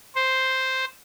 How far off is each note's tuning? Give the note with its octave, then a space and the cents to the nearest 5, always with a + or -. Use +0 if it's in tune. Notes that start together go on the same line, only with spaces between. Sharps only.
C5 +0